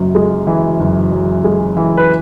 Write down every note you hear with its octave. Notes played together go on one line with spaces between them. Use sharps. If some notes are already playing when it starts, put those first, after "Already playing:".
Already playing: F#1 F#2
G#3
E3
F#1
F#2
G#3
E3
B4